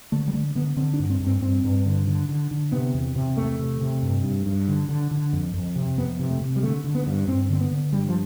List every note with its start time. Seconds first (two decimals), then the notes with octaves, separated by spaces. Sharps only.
0.12 D3 A3
0.28 G3
0.33 D3 A3
0.55 D3 B3
0.77 D3 C4
0.94 D4
0.99 G2
1.10 C4
1.20 G2
1.27 C4
1.41 G2 C4
1.64 G2
1.86 D3
2.07 D3
2.29 D3
2.51 D3
2.72 C3 B3
2.94 E2
3.16 C3
3.37 E2 A3
3.59 C3
3.81 C3
4.03 G2
4.24 G2
4.46 G2
4.68 D3
4.89 D3
5.11 D3
5.33 F2
5.54 F2
5.76 C3
5.97 F2 B3
6.19 C3
6.30 A3
6.41 C3
6.56 G3
6.63 D3 A3
6.84 D3
6.95 B3
7.07 G2
7.27 G2 C4
7.49 D3 C4
7.61 B3
7.71 D3
7.93 G2 G3
8.09 F3